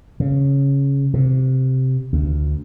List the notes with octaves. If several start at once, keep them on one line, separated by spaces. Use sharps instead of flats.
C#3
C3
D2